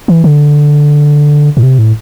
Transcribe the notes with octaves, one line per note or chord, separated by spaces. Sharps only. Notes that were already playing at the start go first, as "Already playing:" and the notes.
E3
D3
A2
C3
A2